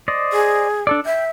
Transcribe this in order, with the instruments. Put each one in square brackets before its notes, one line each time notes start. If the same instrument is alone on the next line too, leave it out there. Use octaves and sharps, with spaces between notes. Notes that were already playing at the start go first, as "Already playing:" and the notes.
[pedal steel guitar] C5 D5 D#5
[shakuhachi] G#4
[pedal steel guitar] D4 A4 D5
[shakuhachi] E5 [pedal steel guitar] G5